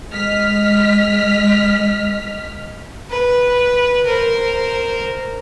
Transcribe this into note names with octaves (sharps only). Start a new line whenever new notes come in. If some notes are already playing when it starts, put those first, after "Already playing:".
G#3 D#5 F6 B6
B4
A#4 C5